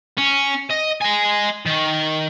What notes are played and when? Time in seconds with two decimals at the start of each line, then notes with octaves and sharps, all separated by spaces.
0.18 C#4
0.71 D#5
1.02 D#5 G#5
1.67 D#3